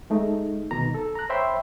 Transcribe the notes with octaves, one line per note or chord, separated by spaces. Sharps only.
G#3 A3 D#4
C2 B2 D#3 A#5
A4
A#5 F#6
C5 C#5 E5 G5 B5 C6